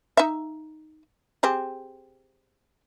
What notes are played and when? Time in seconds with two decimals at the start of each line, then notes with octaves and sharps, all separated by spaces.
0.17 D#4 E5
1.43 C4 G4 G#4